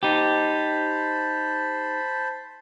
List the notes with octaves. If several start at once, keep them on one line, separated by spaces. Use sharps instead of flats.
D#4 G4 C5 A5 B5